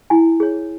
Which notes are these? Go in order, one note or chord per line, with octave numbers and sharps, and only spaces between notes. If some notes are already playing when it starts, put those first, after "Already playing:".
E4 G#5
G#4 C#5